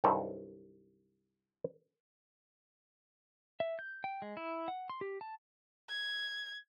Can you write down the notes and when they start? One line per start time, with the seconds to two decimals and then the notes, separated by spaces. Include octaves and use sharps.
0.04 C2 G2 D#3 F#3 C4 A4
3.60 E5
3.79 G6
4.04 G5
4.22 G#3
4.37 E4
4.68 F#5
4.90 C6
5.01 G4
5.21 A5
5.90 G#6